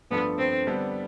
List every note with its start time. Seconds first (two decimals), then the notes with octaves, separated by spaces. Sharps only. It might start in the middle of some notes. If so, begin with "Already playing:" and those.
0.11 G2 F3 A3 B3 D4 A4
0.38 C4
0.67 D3 G3 B3 D4 A4